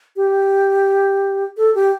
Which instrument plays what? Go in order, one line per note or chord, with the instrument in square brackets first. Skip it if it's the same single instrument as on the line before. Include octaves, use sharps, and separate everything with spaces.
[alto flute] G4
A4
G4